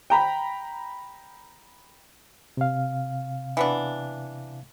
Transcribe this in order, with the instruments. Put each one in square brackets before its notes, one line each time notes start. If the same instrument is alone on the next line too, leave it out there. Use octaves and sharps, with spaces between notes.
[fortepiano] G5 A#5 B5
[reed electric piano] C3 F5
[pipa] E3 B3 D4